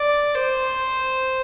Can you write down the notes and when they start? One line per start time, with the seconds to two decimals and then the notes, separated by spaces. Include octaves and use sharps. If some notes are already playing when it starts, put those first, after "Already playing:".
Already playing: D5
0.35 C5